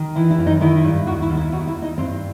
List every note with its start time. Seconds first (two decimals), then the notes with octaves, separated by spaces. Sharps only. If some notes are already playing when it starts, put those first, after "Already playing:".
Already playing: D#3
0.16 E3 E4
0.31 E4
0.38 F#2
0.46 D#4
0.61 D#3 E4
0.84 G2
1.06 D#2 F#4
1.22 E4
1.30 D#2
1.37 E4
1.52 D#2 F#4
1.67 E4
1.75 D#2
1.82 D#4
1.98 G2 C4